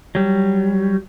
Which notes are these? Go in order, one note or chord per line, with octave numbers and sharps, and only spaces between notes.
F#3 G3